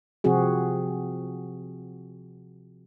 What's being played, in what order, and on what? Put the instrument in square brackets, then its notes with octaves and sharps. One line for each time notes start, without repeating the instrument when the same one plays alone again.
[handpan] C3 F3 C4 F#4 G#4